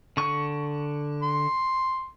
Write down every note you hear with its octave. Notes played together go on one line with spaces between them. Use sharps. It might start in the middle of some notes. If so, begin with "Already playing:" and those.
D3 C#6
C6